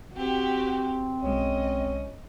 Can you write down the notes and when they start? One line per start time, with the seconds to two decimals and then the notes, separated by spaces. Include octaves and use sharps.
0.14 C4 F#4 G4
1.23 B1 G#3 C#4 D#5